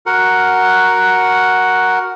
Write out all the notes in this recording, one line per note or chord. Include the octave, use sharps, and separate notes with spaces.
F#4 A#4 F#5